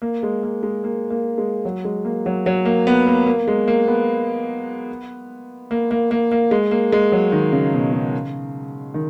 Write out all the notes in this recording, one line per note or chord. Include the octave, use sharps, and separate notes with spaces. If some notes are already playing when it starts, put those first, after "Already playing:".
A#3
G#3
A#3
G#3
A#3
A#3
G#3
F#3
G#3
A#3
F#3
F#3
A#3
B3
A#3
A#3
G#3
A#3
B3
A#3
A#3
A#3
A#3
G#3
A#3
G#3
F#3
D#3
C#3
B2
C#3
D#3